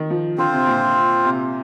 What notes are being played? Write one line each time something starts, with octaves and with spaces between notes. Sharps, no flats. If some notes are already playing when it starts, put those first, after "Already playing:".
Already playing: D#3
F3
D3 C4 F4 C5
C3
A#2
C3